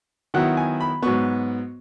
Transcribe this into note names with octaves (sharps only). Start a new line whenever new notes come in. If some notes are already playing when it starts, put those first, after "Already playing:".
D#3 F#3 B3 E4 F#5
G#5
B5
G#2 F#3 B3 C#6